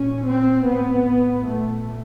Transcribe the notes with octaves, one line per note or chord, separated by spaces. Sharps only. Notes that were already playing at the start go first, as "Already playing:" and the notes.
Already playing: A#2 C#4
C4
A2 B3
A#2 A3